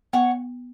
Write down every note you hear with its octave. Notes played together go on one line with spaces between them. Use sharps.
B3 C#5 F#5 C#6